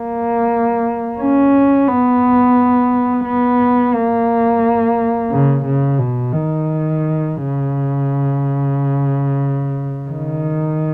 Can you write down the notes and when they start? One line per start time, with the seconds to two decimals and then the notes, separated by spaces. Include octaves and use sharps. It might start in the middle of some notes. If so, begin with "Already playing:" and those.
Already playing: A#3
1.20 C#4
1.88 B3
3.25 B3
3.94 A#3
5.30 C#3
5.65 C#3
5.99 B2
6.33 D#3
7.36 C#3
10.10 D#3